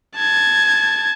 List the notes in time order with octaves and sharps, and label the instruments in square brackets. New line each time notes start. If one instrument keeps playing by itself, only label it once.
[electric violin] A5 G#6